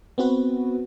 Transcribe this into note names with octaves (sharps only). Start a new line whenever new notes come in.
B3 C4 F#4 B4